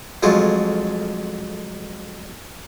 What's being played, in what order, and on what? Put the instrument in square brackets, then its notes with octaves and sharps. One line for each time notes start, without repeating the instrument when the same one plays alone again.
[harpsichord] F2 F#3 G#3 A3 F4